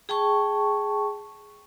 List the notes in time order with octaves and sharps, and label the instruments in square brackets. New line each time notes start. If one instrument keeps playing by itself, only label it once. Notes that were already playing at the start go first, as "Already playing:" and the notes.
[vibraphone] G#4 G5 A5 C#6